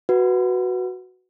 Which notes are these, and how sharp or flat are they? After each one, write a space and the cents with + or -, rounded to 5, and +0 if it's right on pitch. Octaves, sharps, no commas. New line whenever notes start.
F#4 +0 B4 +0